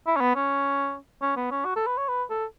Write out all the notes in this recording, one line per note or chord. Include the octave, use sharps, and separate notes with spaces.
E4
C#4
B3
C#4
C#4
B3
C#4
F#4
A4
B4
C#5
B4
A4